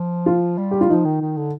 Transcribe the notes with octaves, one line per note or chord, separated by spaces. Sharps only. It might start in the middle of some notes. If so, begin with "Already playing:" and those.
Already playing: F3
F4
G3
G4
F4
F3 D#4
D#3
D#3
D3